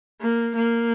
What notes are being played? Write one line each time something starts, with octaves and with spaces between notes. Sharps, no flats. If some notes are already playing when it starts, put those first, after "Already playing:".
A#3
A#3